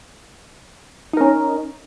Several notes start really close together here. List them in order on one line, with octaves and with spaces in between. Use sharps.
D#4 A#4 C#4